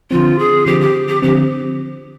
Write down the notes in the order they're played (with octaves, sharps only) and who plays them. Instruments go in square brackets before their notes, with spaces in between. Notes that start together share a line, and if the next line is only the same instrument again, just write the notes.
[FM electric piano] D3 F3 C4 [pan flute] F4
[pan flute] G#4
[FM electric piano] D3 F3 C4 [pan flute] G4
[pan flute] G4
G4
[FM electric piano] D3 F3 C4 [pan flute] G4